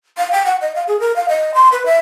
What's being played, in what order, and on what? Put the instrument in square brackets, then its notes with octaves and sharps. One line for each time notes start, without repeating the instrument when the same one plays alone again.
[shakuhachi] F5
G5
F#5
D#5
F5
G#4
A#4
F5
D#5
C6
B4
E5